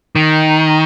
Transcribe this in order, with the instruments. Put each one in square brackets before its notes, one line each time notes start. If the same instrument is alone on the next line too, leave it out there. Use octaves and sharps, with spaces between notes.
[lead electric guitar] D#3